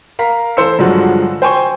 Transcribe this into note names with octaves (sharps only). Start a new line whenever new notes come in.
A#4 F5 A#5 B6
E3 A4 C5 C6 E6 C#7
G2 D3 F3 F#3 G#3 F#4
C5 G5 G#5 C6 C#6